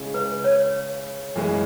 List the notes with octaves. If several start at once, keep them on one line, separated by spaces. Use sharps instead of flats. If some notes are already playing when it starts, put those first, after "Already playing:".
Already playing: C#3 G#3 C#4 E4 G#4
B4
C#5
F#2 E3 G#3 C#4 E4